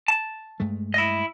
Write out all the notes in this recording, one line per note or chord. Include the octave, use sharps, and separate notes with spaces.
A5
G2 G#3 A3
E4 D#5